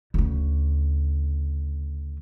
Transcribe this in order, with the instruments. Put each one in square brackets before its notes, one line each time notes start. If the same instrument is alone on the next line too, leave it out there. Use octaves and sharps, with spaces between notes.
[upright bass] D2 C#3